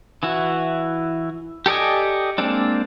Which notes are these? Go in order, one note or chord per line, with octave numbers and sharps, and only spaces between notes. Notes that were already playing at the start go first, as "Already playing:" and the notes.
E3 E4 F#4
G4 A4 D5 D#5 G#5
G#3 A#3 C4 D4